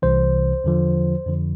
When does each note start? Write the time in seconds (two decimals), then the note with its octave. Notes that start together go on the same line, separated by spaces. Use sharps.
0.02 C2 C3 E3 C5
0.64 E2 D3 F3
1.26 F2 D3 F3